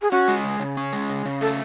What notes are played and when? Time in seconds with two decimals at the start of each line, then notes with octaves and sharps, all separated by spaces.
0.02 G#4
0.11 C#4 F#4
0.28 G#3
0.44 C#3
0.60 C#3
0.77 C#4
0.93 G#3
1.10 C#3
1.25 C#3
1.41 A3 A4